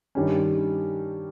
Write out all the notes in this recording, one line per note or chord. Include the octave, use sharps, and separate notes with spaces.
G2 D#3 G3 C#4